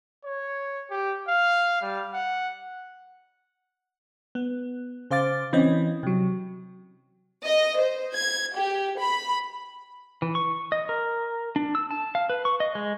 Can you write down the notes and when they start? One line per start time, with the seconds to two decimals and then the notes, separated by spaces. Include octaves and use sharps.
0.25 C#5
0.90 G4
1.28 F5
1.82 G3
2.14 F#5
4.35 B3
5.11 C#3 C5 F5 D6 A6
5.53 E3 C4 C#4 D#5
6.03 C3 F#3
7.44 D#5
7.78 C5
8.16 G#6
8.56 G4
9.00 B5
10.22 E3
10.35 C#6
10.72 D#5
10.89 A#4
11.56 D4
11.75 E6
11.91 A5
12.15 F5
12.30 B4
12.45 C#6
12.60 D#5
12.75 G#3